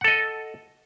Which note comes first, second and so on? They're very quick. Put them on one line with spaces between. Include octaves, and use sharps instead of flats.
F#5 A4 D#5